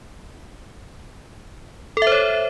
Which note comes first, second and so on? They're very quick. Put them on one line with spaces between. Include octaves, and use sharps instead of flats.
A4 E5 C5 C#5